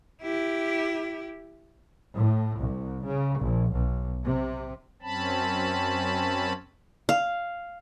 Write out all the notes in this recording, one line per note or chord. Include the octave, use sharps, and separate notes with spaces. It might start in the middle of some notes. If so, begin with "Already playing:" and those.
E4 G4
A2
C2
C#3
A#1
B1
C3
F#2 C4 C#4 A5 B5
F5